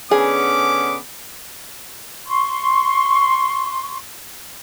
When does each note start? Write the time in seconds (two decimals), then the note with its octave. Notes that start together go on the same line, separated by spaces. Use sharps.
0.11 D3 B3 C#4 G#4 D6
2.26 C6 C#6